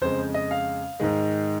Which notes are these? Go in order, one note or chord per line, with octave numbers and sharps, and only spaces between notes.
F2 C#3 G#3 C5
D#5
F5
G#2 D#3 G#3